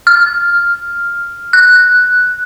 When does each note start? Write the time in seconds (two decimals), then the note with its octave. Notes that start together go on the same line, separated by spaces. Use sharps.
0.07 F6
1.53 F#6